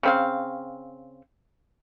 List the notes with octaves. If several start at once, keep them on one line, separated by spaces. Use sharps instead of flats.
C#3 C4 F5